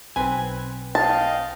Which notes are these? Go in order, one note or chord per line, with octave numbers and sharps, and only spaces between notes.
B1 C4 B4 G#5
D#5 F5 G5 A5